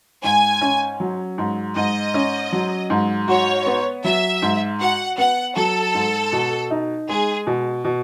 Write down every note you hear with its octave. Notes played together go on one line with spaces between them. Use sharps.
G#2 G#5
C#4
F#3
G#2
G#2 D#5
C#4
F#3
G#2
F#4 C#5
B3
F#3 E5
G#2
F#4 F#5
B3 F#5
F#3 A4
G#2
B2
D#4
G#3 G#4
B2
B2